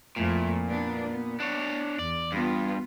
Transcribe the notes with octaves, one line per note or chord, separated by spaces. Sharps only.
F2 A#2 A3 E4
B3 D4
B3
D4 C#5
E2 D5
G2 B3 F4